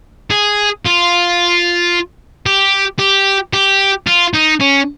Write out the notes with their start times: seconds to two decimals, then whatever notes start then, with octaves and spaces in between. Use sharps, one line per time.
0.30 G#4
0.85 F4
2.46 G4
2.99 G4
3.53 G4
4.07 F4
4.34 D#4
4.61 C#4